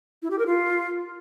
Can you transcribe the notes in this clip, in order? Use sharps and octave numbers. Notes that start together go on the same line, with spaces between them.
E4
G4
A#4
F4